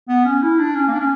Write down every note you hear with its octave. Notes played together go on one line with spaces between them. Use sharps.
B3
C#4
E4
D4
C#4
A#3
D4
C#4